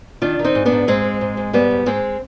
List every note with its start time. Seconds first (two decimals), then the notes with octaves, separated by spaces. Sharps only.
0.22 D#3 D4 F4
0.39 D#3
0.44 C4 D#4
0.55 G#2
0.66 B3 D4
0.72 G#2
0.87 G#2 G#3 C4
1.04 G#2
1.21 G#2
1.37 G#2
1.53 G#2 G3 B3
1.71 G#2
1.86 G#2 G#3 C4